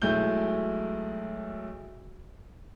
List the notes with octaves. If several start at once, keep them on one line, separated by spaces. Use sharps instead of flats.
B1 G#3 A3 E4 G6 G7